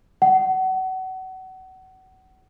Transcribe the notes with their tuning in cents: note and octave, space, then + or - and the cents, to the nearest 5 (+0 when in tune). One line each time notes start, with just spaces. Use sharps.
F#5 +30